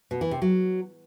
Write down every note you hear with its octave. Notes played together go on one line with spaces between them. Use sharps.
B2
E3
C3
F#3